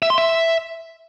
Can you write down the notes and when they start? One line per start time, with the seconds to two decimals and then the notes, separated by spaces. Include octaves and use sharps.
0.02 E5
0.10 C6
0.18 E5